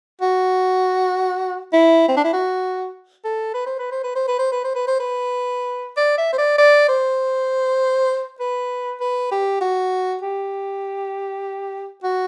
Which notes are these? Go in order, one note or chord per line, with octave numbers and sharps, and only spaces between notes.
F#4
E4
C4
D4
E4
F#4
A4
B4
C5
B4
C5
B4
C5
B4
C5
B4
C5
B4
C5
B4
D5
E5
C5
D5
D5
C5
B4
B4
G4
F#4
G4
F#4